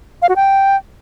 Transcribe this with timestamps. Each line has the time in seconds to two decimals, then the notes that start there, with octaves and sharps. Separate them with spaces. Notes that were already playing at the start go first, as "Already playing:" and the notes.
0.22 F5
0.29 F#4
0.36 G5